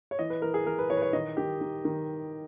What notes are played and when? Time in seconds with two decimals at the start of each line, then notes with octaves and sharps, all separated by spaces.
0.11 C#5
0.19 E3 D#5
0.30 B4
0.42 E3 A#4
0.54 G#4
0.66 E3 A#4
0.79 B4
0.90 E3 C#5
0.97 B4
1.02 C#5
1.13 D#3 D#5
1.37 D#3 G4
1.61 D#3
1.85 D#3